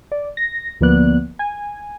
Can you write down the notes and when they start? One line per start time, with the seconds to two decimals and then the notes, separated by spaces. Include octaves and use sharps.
0.12 D5
0.37 A#6
0.81 D2 F3 A#3 B3 D5 F#6
1.39 G#5